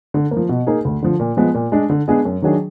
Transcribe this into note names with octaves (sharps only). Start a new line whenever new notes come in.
D3
A#3
F3
B2
A#3 D#4 G#4
D2
D3 F3
A#2
F3 G#3 B3
A#2
G#3 D4
D3
G#3 B3 D4 G#4
F#2
D#3 F#3 D4 G#4